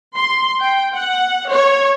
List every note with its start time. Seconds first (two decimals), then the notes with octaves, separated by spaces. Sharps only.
0.17 C6
0.60 G5
0.93 F#5
1.48 C#5